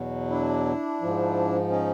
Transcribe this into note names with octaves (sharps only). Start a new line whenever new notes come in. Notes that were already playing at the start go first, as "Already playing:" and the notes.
Already playing: E2 B2 F#3
D4 E4
G#2 F3
C#4 D#4